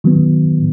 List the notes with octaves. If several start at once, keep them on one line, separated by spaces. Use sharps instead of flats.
D#3 F#3 B3